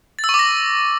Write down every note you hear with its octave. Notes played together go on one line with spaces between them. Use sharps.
A6
E6
C#6
D6
A#6